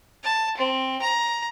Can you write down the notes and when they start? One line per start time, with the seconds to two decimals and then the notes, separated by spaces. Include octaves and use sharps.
0.23 A5
0.57 C4
1.01 A#5